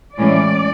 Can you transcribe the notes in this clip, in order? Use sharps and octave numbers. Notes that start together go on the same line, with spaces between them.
A2 E3 G#3 C#4 D5